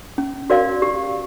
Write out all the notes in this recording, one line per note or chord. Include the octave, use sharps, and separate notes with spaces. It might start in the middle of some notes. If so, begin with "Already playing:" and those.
C#4
F#4 A#4 D5 F5
G4